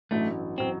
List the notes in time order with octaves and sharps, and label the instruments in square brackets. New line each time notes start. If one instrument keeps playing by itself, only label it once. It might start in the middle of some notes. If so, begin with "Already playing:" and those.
[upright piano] A1 G2 F#3 [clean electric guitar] A3
[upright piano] F#3 [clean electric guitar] C4